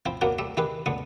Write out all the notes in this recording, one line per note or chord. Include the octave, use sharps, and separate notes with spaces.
F3 C4 E4 C5
F#3 A#3 B3 D4 F#4 A#4
G3 A3 E5
D#3 E4 G4 G#4 B4
C#2 D3 B3 F#5 D#6